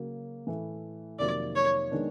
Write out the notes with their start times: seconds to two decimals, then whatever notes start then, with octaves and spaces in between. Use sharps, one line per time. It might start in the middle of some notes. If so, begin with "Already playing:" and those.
Already playing: C#3 F#3 A#3
0.47 A2 E3 A3
1.19 F2 C3 D#3 F#3 A#3 D5
1.56 C#5
1.91 D#3 G#3 B3 D4